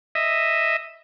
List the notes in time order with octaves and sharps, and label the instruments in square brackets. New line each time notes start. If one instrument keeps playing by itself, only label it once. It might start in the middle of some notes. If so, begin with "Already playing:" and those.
[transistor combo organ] D#5 E5